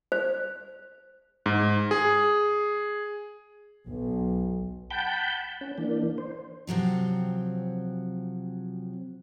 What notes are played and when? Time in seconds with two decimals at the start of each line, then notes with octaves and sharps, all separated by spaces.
0.12 C5
1.46 G#2
1.91 G#4
3.88 B1
4.91 F#5 G5 A5 B5 G6
5.61 C#4
5.78 E3 A#3 D4
6.18 C5
6.67 C3 F3 F#3 C4